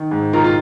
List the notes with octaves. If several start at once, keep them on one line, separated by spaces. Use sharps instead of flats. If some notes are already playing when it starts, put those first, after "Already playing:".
Already playing: D#3
G#2
D#3 F4 A#4
F4